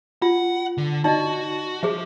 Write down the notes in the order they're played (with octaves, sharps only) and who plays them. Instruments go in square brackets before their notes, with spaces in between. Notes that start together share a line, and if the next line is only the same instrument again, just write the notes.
[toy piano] F4 [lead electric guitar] F#5
[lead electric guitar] D3
[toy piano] D#4 D5 D#5 [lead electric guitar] F#4
[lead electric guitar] F3 [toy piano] G#4 C5 E5